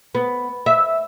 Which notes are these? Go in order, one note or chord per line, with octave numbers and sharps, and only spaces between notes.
B3
E5